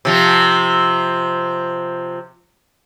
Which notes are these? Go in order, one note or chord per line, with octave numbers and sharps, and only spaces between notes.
C3 F3